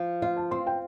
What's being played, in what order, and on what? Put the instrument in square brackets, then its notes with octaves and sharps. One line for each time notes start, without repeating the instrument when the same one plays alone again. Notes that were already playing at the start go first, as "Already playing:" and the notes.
Already playing: [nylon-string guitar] F3
[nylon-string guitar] F4 [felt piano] F5
[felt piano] A5
[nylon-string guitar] C4 [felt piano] C6
[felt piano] G5